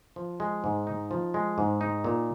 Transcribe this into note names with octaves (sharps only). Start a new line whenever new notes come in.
F3
G#3
G#2
D#4
F3
G#3
G#2
D#4
A#2